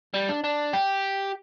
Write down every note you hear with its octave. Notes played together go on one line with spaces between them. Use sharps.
G3
D4
D4
G4